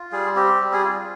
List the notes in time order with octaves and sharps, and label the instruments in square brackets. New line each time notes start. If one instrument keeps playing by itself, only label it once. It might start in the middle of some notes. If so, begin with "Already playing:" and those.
Already playing: [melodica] F4
G3 G#4
C4 G4
G3
G#4
F4